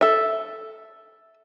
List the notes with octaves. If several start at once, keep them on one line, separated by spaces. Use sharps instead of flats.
A4 E5